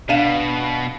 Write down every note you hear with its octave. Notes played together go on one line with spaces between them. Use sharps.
B2 D4 F5 D#7